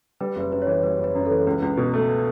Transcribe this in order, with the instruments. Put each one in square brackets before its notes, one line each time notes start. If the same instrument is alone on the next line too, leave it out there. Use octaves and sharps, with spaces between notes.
[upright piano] G3 [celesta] B4
[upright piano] F#1 [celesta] B4
[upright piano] F#2 [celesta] B4
[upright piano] E3 [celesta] C#5
[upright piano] G3 [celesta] B4
[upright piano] F#1
[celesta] B4
[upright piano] F#2
[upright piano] E3 [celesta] A4
[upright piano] C#2 [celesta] B4
[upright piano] C#2
B2
A3